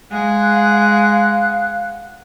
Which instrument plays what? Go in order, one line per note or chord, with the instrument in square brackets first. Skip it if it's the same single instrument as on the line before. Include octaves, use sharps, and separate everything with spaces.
[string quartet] G#3 G#4 [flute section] F5 F#5 F#6